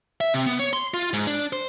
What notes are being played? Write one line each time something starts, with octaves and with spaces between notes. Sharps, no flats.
E5
C3
B3
C#5
C6
F4
G#2
D4
C5